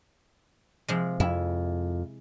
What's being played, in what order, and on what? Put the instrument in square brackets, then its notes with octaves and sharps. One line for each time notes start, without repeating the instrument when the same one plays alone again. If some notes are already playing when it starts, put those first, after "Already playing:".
[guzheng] C3 F3 G#3
[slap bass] F2 [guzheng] E4